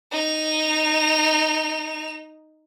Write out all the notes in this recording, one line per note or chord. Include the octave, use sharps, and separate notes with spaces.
D#4 F7